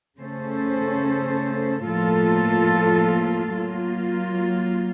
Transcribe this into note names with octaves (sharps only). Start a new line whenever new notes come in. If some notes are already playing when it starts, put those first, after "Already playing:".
C#3 A3 C#4 A4 C5
A2 F3 A#3 F4 A4
F#3 A#3 F4